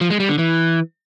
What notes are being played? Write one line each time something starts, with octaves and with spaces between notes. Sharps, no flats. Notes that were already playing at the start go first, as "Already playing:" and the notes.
F3
G#3
G3
D3
E3